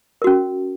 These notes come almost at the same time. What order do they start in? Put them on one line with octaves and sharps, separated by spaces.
A#4 F#4 C#4